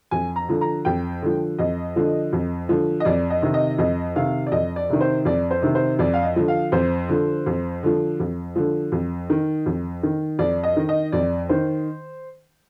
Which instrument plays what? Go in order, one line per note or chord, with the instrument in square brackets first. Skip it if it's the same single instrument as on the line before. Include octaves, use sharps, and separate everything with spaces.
[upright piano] F2 G#5
A#5
D3 F3
A#5
F2 G5
D3 F3
F2 D#5
D3 F3
F2
D3 F3
D#5
F2 D5
D#5
C3 D#3
D#5
F2 D#5
C3 D#3 F5
D5
F2 D#5
D5
C3 D#3
C5
F2 D5
C5
C3 D#3
C5
F2 D5
F5
D#5
D3 F3
F5
F2 C5
D3 F3
F2
D3 F3
F2
D3 F3
F2
D#3
F2
D#3
F2 D5
D#5
D#3
D#5
F2 D5
D#3 C5